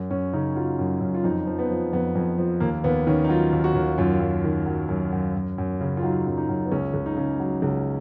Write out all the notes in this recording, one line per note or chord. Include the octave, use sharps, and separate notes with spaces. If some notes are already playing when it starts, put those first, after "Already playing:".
Already playing: F#2
F#2 C#4
C#3 D#4
F#3 F4
F#2
F#2
F4
F2 D#4
F3
B3
F3
F2 B3
F2
F3
D#2 A#3
D#2 B3
D#3 C#4
D#4
F#3 F4
D#2
F#4
D#2
F#2 F4
F#2
D#3
F#3
F#2
F#2
F#2
F#2
C#3
F4
F#3 D#4
F#2
D#4
F#2
B3
C#2 C#4
C#2
D#4
C#3
F#3
C#2